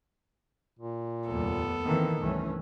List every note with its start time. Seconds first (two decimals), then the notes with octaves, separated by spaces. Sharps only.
0.79 A#2
1.28 F1 D#2 G3 B3 A4
1.85 D#3 E3 A#3 C4
2.21 C2 G2 E3 A3 C#4